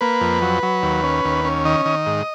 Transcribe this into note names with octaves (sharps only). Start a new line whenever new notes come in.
A#3 B4
F2
F#3
F#3
D#2
C#4
D#2
C#4
D#3 D#5
D#3
G#2